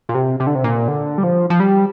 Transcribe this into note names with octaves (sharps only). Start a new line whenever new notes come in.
A#2
C3
C3
D3
C3
A#2
D3
G3
F3
F3
G3